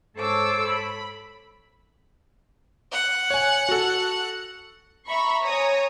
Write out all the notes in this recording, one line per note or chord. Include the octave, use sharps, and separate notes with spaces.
G#2 A4 C5 C#5 D6 E6
B5
F#5
C#5 G#5
F#4 A4
E5 A#5 B5 C#6
C#5 G#5 A#5 D#6